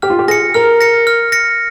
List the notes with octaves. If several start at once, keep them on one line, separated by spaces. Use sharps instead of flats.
G4 F6
F4
G4
G#4 A#6 C#7
A#4 F6
A#6 C#7
F6
A#6 C#7